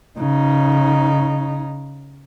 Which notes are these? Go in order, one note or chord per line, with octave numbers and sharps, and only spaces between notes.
C#3 D#4